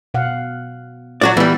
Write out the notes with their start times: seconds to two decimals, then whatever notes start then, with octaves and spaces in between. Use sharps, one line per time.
0.14 B2 F5 F#5
1.21 F#3 F#4 D5
1.37 E3 G3 B3